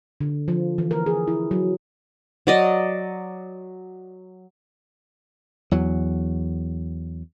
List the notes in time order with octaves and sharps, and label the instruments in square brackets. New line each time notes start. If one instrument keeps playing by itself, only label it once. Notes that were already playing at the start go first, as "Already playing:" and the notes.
[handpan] D3
F3
E3
A#4
G#4
E4
F#3
[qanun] F#3 D5 D#5
[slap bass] E2 F#3